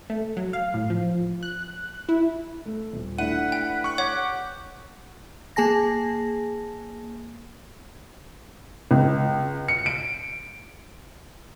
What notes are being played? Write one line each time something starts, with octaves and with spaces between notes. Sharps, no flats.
A3
F#3
F5
A2
F3
F#6
E4
A3
D#1
A3 D4 E4 B4 F#5 D#7
G5
C#6 F#6
G4 C#5 F#5
A#3 G#4 G#5 A5 A#6
C#2
C#7
D7